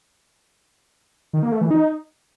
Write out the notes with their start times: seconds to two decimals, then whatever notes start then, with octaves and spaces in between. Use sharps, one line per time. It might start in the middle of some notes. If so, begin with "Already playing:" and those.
1.33 D#3
1.43 A#3
1.52 A3
1.61 E3
1.71 D#4